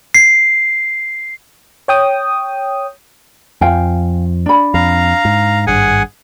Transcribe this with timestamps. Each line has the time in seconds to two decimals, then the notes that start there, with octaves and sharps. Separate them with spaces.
0.14 C7
1.88 C#5 G5 D#6
3.61 F2 F3 F5 G5 G#5
4.46 D4 B5
4.74 F2 F5 A#5
5.25 G#2
5.67 G#1 G2 G#4 F#5 G#5